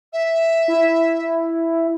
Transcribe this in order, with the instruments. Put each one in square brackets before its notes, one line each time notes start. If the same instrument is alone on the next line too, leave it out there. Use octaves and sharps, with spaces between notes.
[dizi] E5
[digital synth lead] E4